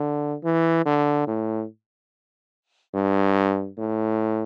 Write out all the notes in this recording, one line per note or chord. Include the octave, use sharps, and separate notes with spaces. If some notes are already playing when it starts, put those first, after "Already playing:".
Already playing: D3
E3
D3
A2
G2
A2